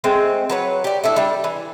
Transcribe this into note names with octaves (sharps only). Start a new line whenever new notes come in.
G#3 A3 C4
F#3 B4 C#5
G4 D5
A3 D4 E4
G3 D4
E3